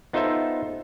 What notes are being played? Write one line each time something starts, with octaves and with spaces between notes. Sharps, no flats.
B3 D#4 F4 A4 C5 E5